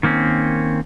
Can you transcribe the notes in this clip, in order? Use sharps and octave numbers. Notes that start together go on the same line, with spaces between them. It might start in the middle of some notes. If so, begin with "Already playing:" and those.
D#3 A#3 C4 C#4